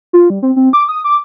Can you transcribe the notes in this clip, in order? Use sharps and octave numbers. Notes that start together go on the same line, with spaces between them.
F4
G3
C4
C4
D6
D#6
D6